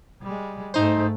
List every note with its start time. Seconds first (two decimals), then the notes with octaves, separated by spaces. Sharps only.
0.22 G3 G#3
0.74 G#2 A3 D#4 C5